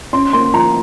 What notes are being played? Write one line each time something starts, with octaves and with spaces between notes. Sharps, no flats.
C#4 C6
A#3 C6
F3 A#5